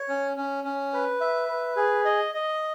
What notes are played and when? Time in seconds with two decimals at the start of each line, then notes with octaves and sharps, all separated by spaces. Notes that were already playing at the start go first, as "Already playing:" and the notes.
Already playing: C#5
0.09 C#4
0.37 C#4
0.64 C#4
0.93 B4
1.21 E5
1.48 B4
1.77 G#4
2.05 D#5
2.34 D#5